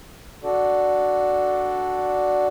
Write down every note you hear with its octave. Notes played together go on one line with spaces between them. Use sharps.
D4 F#4 A4 D5